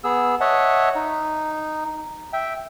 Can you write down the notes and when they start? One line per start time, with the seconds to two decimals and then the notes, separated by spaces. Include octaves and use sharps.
0.04 B3 G#4 E6
0.41 C#5 D#5 E5 F#5 A5
0.95 D#4
2.33 E5 G5